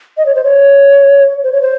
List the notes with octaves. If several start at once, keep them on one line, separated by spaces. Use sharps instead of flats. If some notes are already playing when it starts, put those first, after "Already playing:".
D#5
C#5
C5
C#5
C5
C#5
C5